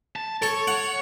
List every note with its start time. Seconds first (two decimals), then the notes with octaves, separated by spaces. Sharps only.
0.16 A5
0.42 A4 C#5 A5
0.67 F#5